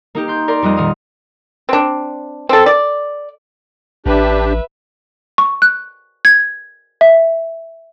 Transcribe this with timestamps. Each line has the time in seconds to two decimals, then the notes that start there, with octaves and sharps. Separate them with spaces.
0.15 A#3 D#4 G4
0.28 C6 G6
0.48 A#4 D5 C6
0.62 F2 G3 F4 D#5 F#6
0.77 D#1 F5 D#6
1.69 C4 D4
2.49 C4 A4
2.66 D5
4.06 A1 D4 G4 B4 E5
5.38 C#6
5.62 F#6
6.25 G#6
7.01 E5